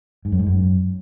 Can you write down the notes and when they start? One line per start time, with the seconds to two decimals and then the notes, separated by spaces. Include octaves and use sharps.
0.25 G#2
0.32 F#2
0.39 G#2
0.46 F#2